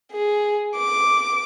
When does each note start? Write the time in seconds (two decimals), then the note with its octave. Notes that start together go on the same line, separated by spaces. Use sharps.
0.12 G#4
0.77 D6